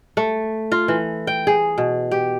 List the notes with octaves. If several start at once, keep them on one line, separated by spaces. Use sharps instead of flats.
A3
F4
E3
G5
G#4
B2
G4